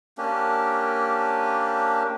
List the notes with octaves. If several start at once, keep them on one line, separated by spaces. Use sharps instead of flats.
A#3 C#4 D4 G4